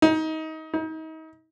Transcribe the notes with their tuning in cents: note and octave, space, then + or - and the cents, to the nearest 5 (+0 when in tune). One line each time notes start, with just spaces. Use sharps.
D#4 +25
D#4 +35